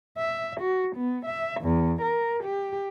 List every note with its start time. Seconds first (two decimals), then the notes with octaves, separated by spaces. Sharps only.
0.18 E5
0.61 F#4
0.96 B3
1.26 E5
1.61 E2
2.01 A#4
2.44 G4